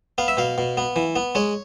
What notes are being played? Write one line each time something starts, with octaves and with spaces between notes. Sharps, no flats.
B3 F5
E5
B2 F5
B2
B3
E3
B3
G#3 C#5